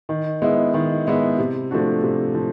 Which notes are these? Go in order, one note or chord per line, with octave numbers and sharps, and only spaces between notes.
D#3
G#3 B3 E4
D#3
G#3 B3 E4
C3
F3 A3 D4 F#4
C3
F3